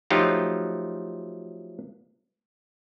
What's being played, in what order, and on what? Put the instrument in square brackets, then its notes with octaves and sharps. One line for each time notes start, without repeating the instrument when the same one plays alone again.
[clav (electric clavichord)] F3 F#3 A3 D#4 F4 G4